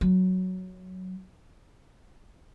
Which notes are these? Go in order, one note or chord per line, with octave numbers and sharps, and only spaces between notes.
F#3